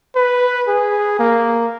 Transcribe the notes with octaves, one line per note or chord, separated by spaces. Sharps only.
B4
G#4
A#3